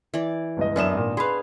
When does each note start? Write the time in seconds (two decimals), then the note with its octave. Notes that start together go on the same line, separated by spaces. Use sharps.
0.14 E3 D5
0.57 G1 C#2 D#5
0.76 F#2 B3 D4 D#5 E5 E7
0.94 G#1 A#2
1.17 G#4 B4 F5 B5 C6